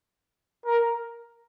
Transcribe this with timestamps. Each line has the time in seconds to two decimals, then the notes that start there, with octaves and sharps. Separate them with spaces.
0.66 A#4